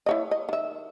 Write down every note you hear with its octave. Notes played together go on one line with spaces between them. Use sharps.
E4 C#5 D#5
D#5
D#3 E5